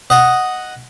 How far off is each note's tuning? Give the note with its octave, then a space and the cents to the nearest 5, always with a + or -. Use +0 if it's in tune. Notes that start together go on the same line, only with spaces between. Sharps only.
D#5 +0 F#5 +0